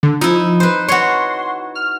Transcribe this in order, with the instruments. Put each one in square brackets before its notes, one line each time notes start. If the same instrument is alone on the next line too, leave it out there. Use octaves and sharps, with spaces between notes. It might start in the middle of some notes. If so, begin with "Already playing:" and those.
[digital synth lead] D3
[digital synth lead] F3 [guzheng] D#4 E4
[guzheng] B4 C5
[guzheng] F#4 C#5 [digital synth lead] C6
[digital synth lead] F6